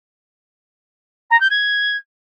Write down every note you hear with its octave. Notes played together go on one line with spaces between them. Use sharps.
A#5
G6
G#6